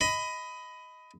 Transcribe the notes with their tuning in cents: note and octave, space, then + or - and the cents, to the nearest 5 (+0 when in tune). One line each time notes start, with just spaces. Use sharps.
D#5 +15 B5 +20